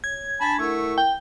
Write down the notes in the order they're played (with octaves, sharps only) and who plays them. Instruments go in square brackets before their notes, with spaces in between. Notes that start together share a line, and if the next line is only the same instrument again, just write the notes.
[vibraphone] C#5 [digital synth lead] G#6
[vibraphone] D4 [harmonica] G#5 A5 B5
[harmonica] A3 C#6 [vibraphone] E4 A#4 F#5
[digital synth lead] G5